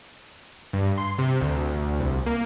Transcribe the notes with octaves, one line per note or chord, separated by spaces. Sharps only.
G2
C6
C3
D2
C2
A#3